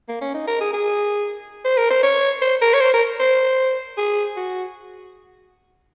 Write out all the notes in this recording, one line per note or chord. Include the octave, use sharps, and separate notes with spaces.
A#3
C#4
D#4
A#4
G#4
G#4
C5
A#4
C5
C#5
C5
A#4
C#5
C5
A#4
C5
G#4
F#4